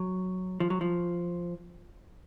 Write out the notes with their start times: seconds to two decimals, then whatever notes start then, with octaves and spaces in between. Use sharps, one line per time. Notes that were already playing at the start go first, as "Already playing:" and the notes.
Already playing: F#3
0.60 F3
0.70 F#3
0.81 F3